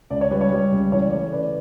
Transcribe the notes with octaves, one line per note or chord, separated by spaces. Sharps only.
C#2 D5
C#5
G3 B4
C#5
G3
C#2
E3 C#5
D5
A3 C#5
C#3 B4 D5